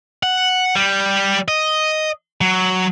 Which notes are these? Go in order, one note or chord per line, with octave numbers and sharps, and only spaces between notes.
F#5
G3
D#5
F#3